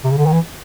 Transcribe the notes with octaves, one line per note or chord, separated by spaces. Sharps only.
C3
C#3
D3
D#3
E3